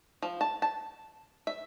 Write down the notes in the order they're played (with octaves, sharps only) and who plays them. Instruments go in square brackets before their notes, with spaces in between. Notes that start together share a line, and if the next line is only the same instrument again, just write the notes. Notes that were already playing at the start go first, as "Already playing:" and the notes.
[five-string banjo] F3
A5
A5
E5